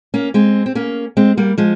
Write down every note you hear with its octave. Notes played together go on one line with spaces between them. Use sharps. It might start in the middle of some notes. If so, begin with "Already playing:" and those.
A#3 C#4
G#3 C4
C4
A#3 C#4
G#3 C4
G3 A#3
F3 G#3